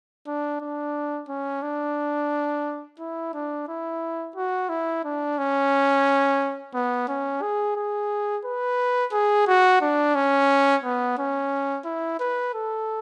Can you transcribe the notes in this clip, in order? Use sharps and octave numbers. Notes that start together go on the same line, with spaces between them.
D4
D4
C#4
D4
E4
D4
E4
F#4
E4
D4
C#4
B3
C#4
G#4
G#4
B4
G#4
F#4
D4
C#4
B3
C#4
E4
B4
A4